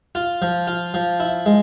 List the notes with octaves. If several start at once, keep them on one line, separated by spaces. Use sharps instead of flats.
F4
F3
F4
F3
E4
G#3